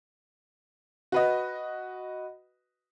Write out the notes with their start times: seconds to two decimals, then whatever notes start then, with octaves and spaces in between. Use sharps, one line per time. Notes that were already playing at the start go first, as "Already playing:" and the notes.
1.12 F#4 B4 D#5